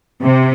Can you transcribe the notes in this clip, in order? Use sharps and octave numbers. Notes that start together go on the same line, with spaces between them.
C3